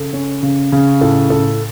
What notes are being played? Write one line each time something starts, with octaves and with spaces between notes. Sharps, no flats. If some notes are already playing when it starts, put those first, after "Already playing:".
Already playing: C#3 A4
C#4
C#3
C#3
A2 A4
A2 A4